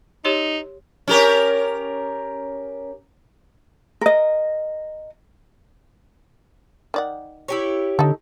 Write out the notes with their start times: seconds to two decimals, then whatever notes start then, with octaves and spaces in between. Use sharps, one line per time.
0.25 D#4 G4 C#5 C6
1.08 C#4 G4 A#4
4.01 A#4 D#5
6.94 D#3 D5 F#5
7.48 E4 G4 C#5
7.99 D3 D#4 A4